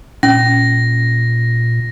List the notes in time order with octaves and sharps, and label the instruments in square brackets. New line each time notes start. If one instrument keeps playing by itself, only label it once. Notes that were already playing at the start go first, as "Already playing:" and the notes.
[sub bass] A#2 [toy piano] C#4 [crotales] A#6